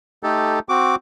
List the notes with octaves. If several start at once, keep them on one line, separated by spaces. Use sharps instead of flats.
A3 D#4 G4 A4
C4 F#4 D6